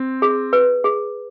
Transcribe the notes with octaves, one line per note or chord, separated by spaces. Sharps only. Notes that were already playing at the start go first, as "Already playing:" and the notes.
Already playing: C4
G#4
B4
G#4